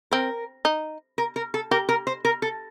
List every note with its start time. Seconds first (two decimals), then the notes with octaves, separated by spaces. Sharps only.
0.11 C4 A#4
0.65 D#4
1.18 A#4
1.36 A#4
1.54 A4
1.71 G4 A#4
1.89 A#4
2.07 C5
2.25 A#4
2.42 A4